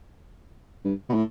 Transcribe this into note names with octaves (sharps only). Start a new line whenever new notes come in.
G2
B2
A2